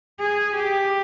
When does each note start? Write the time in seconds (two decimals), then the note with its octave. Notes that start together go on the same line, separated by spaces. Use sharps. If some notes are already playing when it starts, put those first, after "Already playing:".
0.20 G#4
0.56 G4